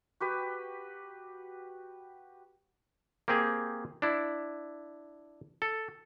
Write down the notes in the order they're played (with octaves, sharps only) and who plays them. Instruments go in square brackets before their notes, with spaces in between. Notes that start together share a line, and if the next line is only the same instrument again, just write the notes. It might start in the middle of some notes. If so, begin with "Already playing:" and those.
[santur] F#4 G4 B4
[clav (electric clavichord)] A#3 C4 G4 G#4
D4 E4
A4